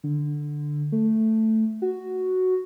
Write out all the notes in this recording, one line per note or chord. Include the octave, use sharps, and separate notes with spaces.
D3
A3
F#4